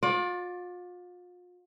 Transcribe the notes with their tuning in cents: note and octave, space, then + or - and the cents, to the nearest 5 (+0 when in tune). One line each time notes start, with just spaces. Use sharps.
F4 +40 D5 +0